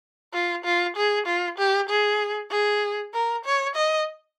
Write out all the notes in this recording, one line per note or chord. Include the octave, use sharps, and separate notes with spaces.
F4
F4
G#4
F4
G4
G#4
G#4
A#4
C#5
D#5